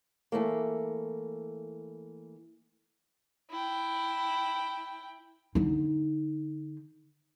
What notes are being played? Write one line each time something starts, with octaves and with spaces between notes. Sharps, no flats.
E3 A3 A#3
E4 G5
D3 D#4